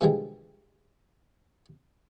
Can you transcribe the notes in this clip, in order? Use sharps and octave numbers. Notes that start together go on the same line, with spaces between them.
B2 D3 E3 F3 G3 G#3